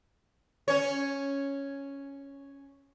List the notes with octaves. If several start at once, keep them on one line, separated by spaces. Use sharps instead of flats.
C#4 C#5